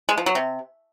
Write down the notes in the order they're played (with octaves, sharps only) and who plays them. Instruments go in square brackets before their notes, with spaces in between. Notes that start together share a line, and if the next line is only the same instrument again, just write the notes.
[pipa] G#3
F3
F#3
C3